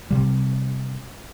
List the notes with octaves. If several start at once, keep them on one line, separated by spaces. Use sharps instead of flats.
C3 G3